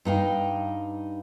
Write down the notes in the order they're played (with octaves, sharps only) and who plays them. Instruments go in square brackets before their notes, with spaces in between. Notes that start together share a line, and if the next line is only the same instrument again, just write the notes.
[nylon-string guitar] G2 D#4 F5 G5